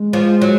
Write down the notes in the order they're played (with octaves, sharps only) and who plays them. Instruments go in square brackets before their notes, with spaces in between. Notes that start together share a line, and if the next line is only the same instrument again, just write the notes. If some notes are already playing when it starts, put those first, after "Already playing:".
Already playing: [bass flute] G#3
[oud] F3
F#3